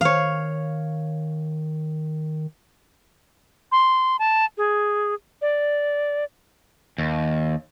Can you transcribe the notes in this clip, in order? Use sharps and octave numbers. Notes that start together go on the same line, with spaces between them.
D#3 C#5 F5
C6
A5
G#4
D5
D#2